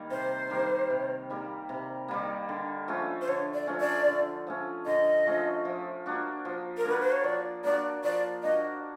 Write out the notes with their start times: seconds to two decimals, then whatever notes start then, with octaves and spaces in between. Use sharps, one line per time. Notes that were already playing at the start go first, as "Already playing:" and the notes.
Already playing: D#3 G3 A#3
0.10 C3 C5
0.50 D#3 G3 A#3
0.90 C3
1.30 D#3 G3 A#3
1.69 C3
2.08 D#3 G3 A#3
2.49 D3
2.88 F3 A3 C#4
3.21 C5
3.27 D3 C#5
3.54 D5
3.67 F3 A3 C#4
3.80 D5
4.07 D3
4.47 F3 A3 C#4
4.86 D3 D#5
5.26 F3 A3 C#4
5.65 F3
6.06 A#3 D4 F#4
6.45 F3
6.77 A#4
6.85 A#3 D4 F#4 B4
7.00 C5
7.12 C#5
7.24 F3 D5
7.64 A#3 D4 F#4 D5
8.04 F3 D5
8.43 A#3 D4 F#4 D#5